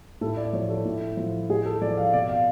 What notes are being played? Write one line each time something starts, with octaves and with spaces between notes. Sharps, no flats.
A2 A4
D5
F3 C#5
A4
A2
F3
A2 G#4
A4
F3 D5
F5
B2 D5
F5